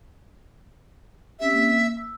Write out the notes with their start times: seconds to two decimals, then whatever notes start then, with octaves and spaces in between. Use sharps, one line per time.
1.40 C4 C#4 G4 E5
1.52 A#3
1.97 E6